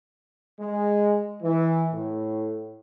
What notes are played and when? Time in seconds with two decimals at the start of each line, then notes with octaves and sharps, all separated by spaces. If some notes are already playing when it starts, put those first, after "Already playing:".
0.59 G#3
1.43 E3
1.93 A2